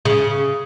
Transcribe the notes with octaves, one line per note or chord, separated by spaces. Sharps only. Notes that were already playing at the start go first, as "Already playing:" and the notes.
C#3